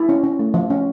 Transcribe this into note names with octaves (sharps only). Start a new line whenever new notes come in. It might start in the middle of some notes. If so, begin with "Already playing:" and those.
Already playing: E4
C#4
C#4
A3
F3
C#4